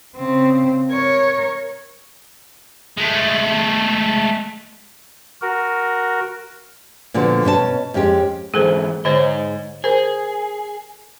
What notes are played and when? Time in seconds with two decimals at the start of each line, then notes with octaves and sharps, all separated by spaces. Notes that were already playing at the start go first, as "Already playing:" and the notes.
0.16 C#3 C4
0.89 A#4 C#5
2.98 G#3 A3
5.42 F#4 A#4
7.14 A#2 D3 F3 B3 F#4
7.45 B2 C#4 A4 A5
7.94 F2 G#3 C#4 G4
8.54 G#2 E3 G#4 A4 C5
9.05 G#2 D3 C5 C#5 D#5
9.84 G#4 A#4 C5